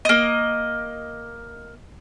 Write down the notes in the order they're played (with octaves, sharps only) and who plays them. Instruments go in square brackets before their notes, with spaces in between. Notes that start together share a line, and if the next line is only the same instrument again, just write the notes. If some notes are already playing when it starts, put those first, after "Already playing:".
[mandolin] A#3 D#5